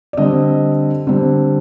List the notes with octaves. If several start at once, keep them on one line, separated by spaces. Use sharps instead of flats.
D5
D3 G3 C4 D#5
D3 G3 C4